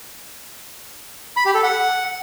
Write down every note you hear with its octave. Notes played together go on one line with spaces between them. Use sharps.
B5
G4
A4
F#5